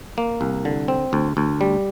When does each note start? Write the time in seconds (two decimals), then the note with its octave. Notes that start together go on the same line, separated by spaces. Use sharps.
0.18 A#3
0.41 C2
0.65 D3
0.88 C4
1.13 D2
1.37 D2
1.61 G3